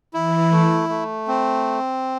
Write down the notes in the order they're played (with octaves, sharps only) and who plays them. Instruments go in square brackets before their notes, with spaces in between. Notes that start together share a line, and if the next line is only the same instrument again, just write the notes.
[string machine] E3 [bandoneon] E4
[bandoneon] A3
A3
C4